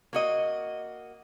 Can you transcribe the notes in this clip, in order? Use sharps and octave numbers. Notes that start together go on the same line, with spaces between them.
A#3 F#4 D#5